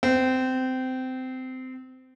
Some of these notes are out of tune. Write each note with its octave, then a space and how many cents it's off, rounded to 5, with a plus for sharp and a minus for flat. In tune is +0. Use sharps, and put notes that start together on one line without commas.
C4 -20